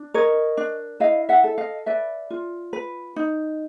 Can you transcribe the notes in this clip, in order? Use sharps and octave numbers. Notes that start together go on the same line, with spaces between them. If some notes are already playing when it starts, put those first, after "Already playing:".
Already playing: D4
A#4 C#5 D#5
D4
E4 D#5 F5
E5 F#5
A4
D#5 F5
B4 D5 E5
F4
B4
D#4